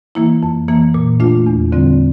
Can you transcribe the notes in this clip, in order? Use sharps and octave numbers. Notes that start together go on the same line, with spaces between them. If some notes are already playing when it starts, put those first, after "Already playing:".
E3 A#3 E4
F2
E3 A#3
A#2
A3 D4 F4
E2
D3 G3 C4 F4